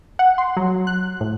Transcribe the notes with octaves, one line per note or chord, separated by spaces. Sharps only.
F#5
C6
F#3
F#6
A2